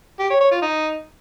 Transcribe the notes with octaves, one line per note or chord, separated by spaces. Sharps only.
G4
C#5
C#5
F4
D#4